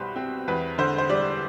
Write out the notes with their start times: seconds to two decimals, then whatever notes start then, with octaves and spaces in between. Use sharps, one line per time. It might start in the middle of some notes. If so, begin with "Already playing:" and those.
Already playing: C2 B2 G3 B4 C5
0.16 C4
0.48 E2 B4
0.78 D3 C5
0.98 C5
1.09 G3 D5